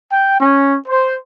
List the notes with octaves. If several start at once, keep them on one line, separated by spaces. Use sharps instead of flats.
G5
C#4
C5